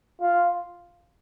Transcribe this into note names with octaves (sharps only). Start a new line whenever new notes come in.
F4